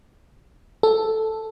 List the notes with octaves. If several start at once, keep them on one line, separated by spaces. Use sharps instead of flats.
A4